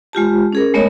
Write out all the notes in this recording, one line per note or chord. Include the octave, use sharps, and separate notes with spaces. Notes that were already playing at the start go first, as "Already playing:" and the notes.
G#3 F4 G4 A5
C#4 G#4 A#4
G#3 A3 B3 A#4 C#5 D#5